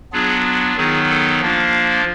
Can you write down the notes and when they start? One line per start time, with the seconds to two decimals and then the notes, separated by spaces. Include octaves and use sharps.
0.12 F#3 B3 D4 F4 G#4
0.77 D#3 F#3 B3 D#4 G#4
1.09 A4
1.41 F3 A#3 D4 F4